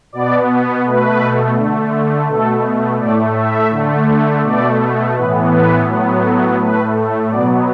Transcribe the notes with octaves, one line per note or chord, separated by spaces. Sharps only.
B2 B3 D5
B2 A3 B4
D3 A3
B2 A3 A4
A2 A3 D5
E5
D3 A3
B2 A3 D5
A2 E3 B3 B4
B4
A2 F#3 B3
A4
A2 A3 B4
B2 F#3 B3 D5